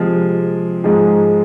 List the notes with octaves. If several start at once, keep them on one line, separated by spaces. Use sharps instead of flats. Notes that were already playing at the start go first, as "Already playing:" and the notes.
Already playing: C3 F3 G#3
G#2 F3 G#3 D#4 G#4